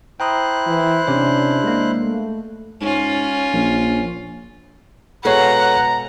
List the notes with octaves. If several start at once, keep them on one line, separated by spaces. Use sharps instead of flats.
E4 C5 G5 A#5 D#6 F#6
E3
C3 C#4 D4 C#5
G#3 A#3
A3
G#2 C#4 F4
A#1
B2 G#3 A4 C#5 F5 F#5 A#5